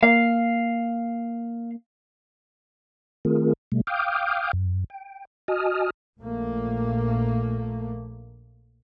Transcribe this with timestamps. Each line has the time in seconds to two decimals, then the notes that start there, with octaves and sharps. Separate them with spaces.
0.03 A#3 F5
3.25 D#3 A3 C4 F4 G#4 A#4
3.72 B2 G3 A3
3.87 F5 G5 D6 D#6 F6 G6
4.53 F#2
4.90 G5
5.48 F#4 D#5 G#5 A5 D#6 F6
6.19 A#1 A#2 A3 A#3